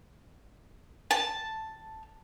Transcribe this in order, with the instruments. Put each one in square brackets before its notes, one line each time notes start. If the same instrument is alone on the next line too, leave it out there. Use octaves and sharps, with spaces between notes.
[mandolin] A5